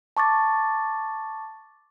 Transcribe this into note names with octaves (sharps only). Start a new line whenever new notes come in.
A5 C#6 D6 A6